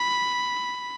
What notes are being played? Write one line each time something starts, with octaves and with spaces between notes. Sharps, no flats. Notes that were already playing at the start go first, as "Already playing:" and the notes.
Already playing: B5